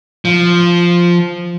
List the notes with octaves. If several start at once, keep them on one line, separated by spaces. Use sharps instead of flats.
F3